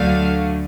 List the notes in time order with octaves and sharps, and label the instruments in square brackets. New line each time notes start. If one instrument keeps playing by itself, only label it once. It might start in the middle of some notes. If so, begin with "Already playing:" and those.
Already playing: [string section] D2 D3 F#3 A3 F5